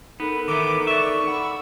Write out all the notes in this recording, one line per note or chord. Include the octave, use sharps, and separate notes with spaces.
B3 D#4 A4 A#4
D#3 E3 B3 D6
D5 E5 C#6
F#5 B5 E6